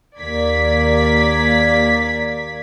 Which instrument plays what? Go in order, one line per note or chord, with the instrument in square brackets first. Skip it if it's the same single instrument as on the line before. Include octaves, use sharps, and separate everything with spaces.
[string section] D#2 A#3 D5 G#6 B6